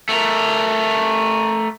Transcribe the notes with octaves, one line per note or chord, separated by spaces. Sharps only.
A3 A#4